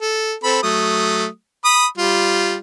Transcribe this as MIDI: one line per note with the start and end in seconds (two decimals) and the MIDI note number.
0.01 0.34 69
0.44 0.58 60
0.44 0.58 69
0.44 0.58 83
0.63 1.26 54
0.63 1.26 57
0.63 1.26 87
1.64 1.86 83
1.64 1.86 87
1.98 2.56 55
1.98 2.56 65